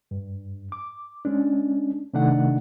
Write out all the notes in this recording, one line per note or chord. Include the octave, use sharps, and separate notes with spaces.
G2
D6
G#3 C#4 D4
C3 D#3 A3 D4 D#4 F#5